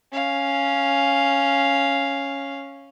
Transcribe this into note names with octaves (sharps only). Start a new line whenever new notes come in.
C#4 F5